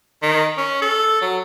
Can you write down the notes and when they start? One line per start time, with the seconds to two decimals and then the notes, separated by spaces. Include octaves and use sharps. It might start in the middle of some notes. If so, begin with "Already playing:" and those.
0.23 D#3
0.58 C#4
0.82 A4
1.21 F#3